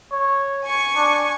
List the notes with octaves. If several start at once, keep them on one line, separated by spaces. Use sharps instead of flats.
C#5
G#5 C#6
D4